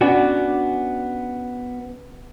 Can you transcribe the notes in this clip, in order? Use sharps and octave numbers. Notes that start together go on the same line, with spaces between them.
B3 C#4 D4 F#4